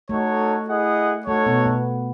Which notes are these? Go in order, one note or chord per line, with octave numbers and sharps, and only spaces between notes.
A3 D#4 F#4 A4 C#5
E4 G#4 D#5 F#5
A3 D#4 F#4 A4 C#5
B2 B3
B2 B3